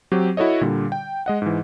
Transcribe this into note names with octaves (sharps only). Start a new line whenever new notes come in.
F#3 C4 G4
E4 F#4 A4 C#5 D#5
A#2 D3 G3
G5
G#3 D#5 F#5
G#2 E3